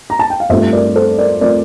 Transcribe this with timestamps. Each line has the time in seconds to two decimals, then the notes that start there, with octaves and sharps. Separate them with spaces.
0.10 A#5
0.19 A5
0.30 G5
0.40 F5
0.49 G2 F3 A3 C4 C5 E5
0.73 A#4 D5
0.95 A4 C5
1.18 A#4 D5
1.41 F3 A3 C4 A#4 D5